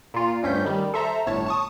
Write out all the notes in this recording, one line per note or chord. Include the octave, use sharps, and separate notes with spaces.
A#2 F4
D2 G2 C#4 G6 B6
D#3 G3
A4 C5 E5 A#5
G1 A2 C#5 A5
A5 C#6 D#6